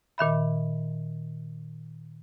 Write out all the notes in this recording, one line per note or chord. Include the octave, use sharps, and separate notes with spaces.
A#2 D#3 E5 B5